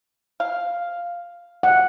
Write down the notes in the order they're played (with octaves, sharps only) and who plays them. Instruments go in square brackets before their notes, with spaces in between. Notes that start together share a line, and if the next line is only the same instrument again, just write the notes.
[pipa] F5
[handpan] F#5